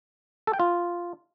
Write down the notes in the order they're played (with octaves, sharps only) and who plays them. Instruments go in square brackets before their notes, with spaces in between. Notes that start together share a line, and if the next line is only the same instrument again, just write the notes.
[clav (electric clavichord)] A4
G5
F4